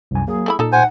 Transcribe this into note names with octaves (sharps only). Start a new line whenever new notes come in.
C2 F#2 G#5
F#3 A#3 G#4
A3 E4 B5
A#2 D#4 A4
C5 F#5 G#5